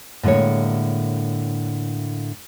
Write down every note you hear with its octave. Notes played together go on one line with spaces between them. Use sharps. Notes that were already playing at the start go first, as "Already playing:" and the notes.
A2 D3 G#3 A#3 C#5